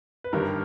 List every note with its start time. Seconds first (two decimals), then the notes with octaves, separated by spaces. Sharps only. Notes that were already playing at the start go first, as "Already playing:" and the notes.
0.24 B4
0.32 G1 G2 D#3 G3 A#4